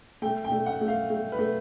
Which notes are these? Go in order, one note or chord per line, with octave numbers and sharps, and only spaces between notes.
A3 G5
G5
A3
F#5
A3
F5
A3
B4
A3